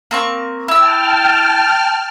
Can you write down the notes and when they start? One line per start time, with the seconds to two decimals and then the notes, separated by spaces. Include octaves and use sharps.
0.11 A#3 C4 C#6
0.68 E4 G5 A5 E6 F6